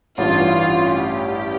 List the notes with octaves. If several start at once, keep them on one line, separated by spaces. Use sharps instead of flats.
A1 G2 E3 F4
G4